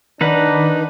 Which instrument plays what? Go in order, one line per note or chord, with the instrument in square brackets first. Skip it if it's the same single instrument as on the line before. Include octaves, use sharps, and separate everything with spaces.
[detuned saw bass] D#3 [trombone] D4 [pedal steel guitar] D#4 B4 F#5